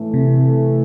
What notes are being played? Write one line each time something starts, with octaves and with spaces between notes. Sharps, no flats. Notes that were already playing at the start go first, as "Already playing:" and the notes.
Already playing: A2 E3 A3
C3